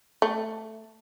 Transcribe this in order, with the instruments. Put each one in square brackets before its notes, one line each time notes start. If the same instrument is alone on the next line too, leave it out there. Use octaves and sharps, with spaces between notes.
[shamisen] A3